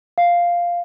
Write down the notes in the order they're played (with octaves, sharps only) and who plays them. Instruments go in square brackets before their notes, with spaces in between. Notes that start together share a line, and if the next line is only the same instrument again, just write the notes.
[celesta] F5